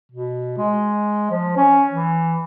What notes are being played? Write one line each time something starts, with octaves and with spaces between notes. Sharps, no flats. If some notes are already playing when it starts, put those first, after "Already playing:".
B2
G#3
F3
C#4
E3